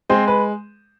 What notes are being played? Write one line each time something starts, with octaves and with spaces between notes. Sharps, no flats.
G#3 C4 C5
B4